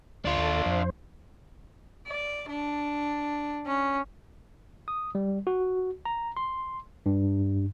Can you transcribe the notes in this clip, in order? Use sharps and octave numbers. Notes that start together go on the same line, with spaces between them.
D2 D4 F4
D#2 A4 A6
F2 C5
D5
D4
C#4
D#6
G3
F#4
A#5
C6
G2